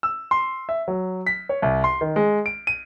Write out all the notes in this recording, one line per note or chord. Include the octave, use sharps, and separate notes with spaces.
E6
C6
E5
F#3
B6
C#5
C2
C6
D#3
G#3
D7
D#7